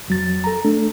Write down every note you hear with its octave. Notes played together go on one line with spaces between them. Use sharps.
F2 F#3 A6
A4 A#5
A3 D4 A4